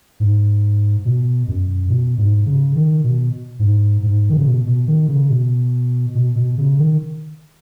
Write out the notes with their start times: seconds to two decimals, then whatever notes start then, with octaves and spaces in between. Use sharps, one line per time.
0.20 G#2
1.05 B2
1.48 F#2
1.89 B2
2.18 G#2
2.46 C#3
2.75 D#3
3.04 B2
3.59 G#2
4.03 G#2
4.29 D#3
4.37 C#3
4.45 B2
4.66 B2
4.88 D#3
5.08 C#3
5.30 B2
6.15 B2
6.36 B2
6.58 C#3
6.79 D#3